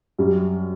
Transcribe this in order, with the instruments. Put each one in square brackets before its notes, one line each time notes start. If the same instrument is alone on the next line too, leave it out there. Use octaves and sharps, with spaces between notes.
[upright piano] F#2 G3